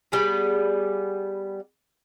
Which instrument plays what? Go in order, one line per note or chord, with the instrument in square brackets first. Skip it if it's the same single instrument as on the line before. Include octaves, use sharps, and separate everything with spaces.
[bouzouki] G3 B3 G#4